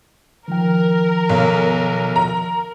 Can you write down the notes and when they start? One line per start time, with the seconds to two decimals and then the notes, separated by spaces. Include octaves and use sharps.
0.48 D#3 F3 A#4 G5
1.29 B1
2.16 A#5